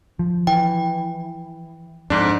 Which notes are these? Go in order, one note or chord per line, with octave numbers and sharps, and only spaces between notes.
F3
E3 G5
F2 G#2 D4